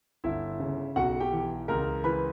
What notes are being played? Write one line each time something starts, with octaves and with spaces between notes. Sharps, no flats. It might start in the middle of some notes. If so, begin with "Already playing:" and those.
G1 E4 E5
C#3
B1 F#4 F#5
G4 G5
E3
C#2 A#4 A#5
E3 B4 B5